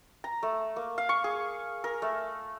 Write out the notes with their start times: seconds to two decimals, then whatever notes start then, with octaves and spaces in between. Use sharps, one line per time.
0.24 A#5
0.43 A3
0.76 A#3
0.98 F5
1.09 C#6
1.24 G#4
1.84 A#4
2.02 A3